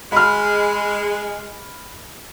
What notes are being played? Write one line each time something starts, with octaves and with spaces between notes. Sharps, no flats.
G#3 B5 F6